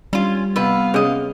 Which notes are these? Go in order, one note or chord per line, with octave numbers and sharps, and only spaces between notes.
G3 C#4 F4
C3 B3 B4 D#5 F5
C3 C#4 G#4 C#5 D#5